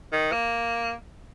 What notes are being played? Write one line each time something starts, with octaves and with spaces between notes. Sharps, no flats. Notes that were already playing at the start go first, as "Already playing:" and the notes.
D#3
A#3